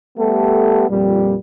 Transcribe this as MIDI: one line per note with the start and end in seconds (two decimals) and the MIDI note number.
0.18 0.86 55
0.18 0.86 57
0.18 0.86 59
0.18 0.86 67
0.18 0.86 69
0.89 1.34 41
0.89 1.34 46
0.89 1.34 55